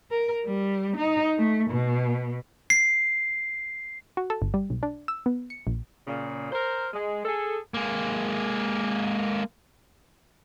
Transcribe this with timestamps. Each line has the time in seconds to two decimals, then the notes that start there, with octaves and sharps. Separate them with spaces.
0.11 A#4
0.45 G3
0.97 D#4
1.38 A3
1.70 B2
2.70 C7
4.17 F#4
4.30 A4
4.42 G1
4.54 G3
4.70 B1
4.83 D4
5.08 E6
5.26 B3
5.50 C#7
5.67 A#1
6.08 A#2 C#3
6.52 A#4 C5
6.93 G#3
7.25 G#4 A4
7.74 G#3 A#3